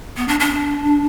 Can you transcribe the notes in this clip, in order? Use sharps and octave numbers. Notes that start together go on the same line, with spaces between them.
B3
D4
D4